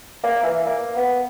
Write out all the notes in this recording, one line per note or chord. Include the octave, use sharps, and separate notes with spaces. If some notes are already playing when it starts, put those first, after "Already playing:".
A#3
E3
A#3
B3